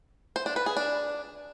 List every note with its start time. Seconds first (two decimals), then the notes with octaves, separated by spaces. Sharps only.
0.36 C5
0.46 D4
0.56 B4
0.66 G#4
0.77 D4